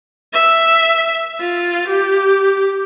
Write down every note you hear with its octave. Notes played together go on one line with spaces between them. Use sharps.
E5
F4
G4